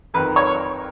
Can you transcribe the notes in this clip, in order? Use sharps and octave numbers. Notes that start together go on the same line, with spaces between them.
F2 D#3 F#3 B4
C#5